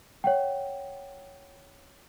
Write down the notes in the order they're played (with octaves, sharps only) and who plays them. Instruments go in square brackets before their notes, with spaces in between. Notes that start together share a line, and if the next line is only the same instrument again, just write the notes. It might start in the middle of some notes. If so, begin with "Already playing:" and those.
[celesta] C#5 F#5 G5